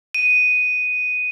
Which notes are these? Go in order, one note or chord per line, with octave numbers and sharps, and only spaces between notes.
D#7